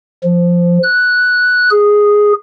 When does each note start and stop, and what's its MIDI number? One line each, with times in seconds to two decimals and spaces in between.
0.24 0.79 53
0.83 1.70 90
1.71 2.33 68